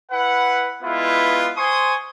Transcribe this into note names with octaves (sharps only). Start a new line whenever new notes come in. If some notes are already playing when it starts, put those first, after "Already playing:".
E4 B4 F#5
G#3 B3 E4 F4 B4
C5 G#5 C6 C#6 D#6